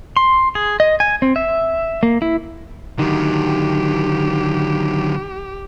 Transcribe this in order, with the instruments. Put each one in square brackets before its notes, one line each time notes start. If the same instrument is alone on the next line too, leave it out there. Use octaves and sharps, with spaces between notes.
[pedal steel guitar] C6
G#4
D#5
G#5
C4
E5
A#3
E4
[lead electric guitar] D3 F#3 [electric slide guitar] D#3 [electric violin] G4